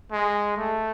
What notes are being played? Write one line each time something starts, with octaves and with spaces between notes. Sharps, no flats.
G#3
A3